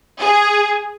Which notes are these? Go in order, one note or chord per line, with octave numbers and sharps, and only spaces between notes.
G#4